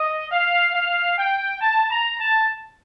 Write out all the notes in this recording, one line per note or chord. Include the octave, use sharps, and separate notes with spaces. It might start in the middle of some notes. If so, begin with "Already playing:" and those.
Already playing: D#5
F5
F5
G5
A5
A#5
A5